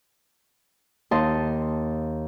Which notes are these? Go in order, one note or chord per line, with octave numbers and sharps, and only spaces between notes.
D#2 D#5 A5 C6 D#6